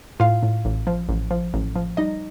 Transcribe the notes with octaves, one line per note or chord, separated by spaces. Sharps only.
A2 F4 F5
A2
A1
F3
A1
F3
A1
F3
G3 D#4 D#5